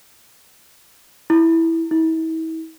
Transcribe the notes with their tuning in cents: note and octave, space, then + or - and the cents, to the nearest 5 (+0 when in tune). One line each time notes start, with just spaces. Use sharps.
E4 -5
E4 -40